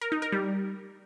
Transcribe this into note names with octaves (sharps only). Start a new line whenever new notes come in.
A#4
D#4
A#4
G3